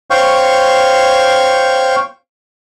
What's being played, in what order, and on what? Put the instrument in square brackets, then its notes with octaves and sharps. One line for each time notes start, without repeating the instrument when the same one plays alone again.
[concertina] C5 C#5 F5 G5 C#6